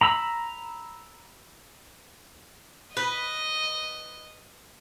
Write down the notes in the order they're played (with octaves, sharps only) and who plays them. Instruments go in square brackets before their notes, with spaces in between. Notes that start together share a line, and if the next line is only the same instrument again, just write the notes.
[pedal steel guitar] A#5 B5 E6
[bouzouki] B4 [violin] D#5